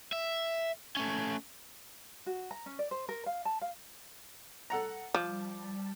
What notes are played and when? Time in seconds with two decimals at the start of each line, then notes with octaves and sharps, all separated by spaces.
0.13 E5
0.97 A3 C#4
2.26 F#4
2.51 A#5
2.66 C#4
2.79 D5
2.91 C5
3.09 A#4
3.26 F5
3.45 A5
3.61 F5
4.70 A4 F#5 A#5
5.14 F3 G3 A5 D6